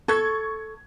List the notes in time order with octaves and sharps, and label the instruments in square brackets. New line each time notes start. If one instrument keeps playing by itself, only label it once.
[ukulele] A4 [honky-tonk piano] C#6 G#6